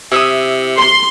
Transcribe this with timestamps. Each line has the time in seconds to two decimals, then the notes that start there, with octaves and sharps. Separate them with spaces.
0.12 C3 E4 E5 D#6
0.79 C6